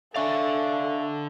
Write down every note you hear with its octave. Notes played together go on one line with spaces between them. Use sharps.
D3 D4 A4 D5 E5 F5 G#5 C#6